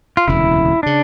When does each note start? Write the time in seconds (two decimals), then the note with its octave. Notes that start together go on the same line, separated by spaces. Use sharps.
0.17 F4
0.27 E1 D2 C#3 E4
0.83 C#3 D4